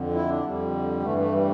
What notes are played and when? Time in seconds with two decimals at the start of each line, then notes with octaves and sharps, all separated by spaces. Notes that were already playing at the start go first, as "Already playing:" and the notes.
Already playing: F2 D3
0.14 E4
0.29 D4
0.44 F2 D3 G3
1.03 G2 E3 A3
1.18 A3
1.32 G3